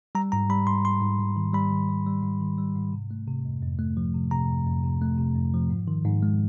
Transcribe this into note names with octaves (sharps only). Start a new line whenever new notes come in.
G3 A#5
G#2 A#5
G3 B5
G#2 C6
G#2 C6
G#2
G#2
D#3
G3 B5
D#3
G3
G3
G#2
D#3
G3
G#2
C3
A3
C3
F2
F2
A3
F3
C3
C3 A#5
F2
F2
C3
A3
C3
F2
F3
G#2
D#3
G#2
G#3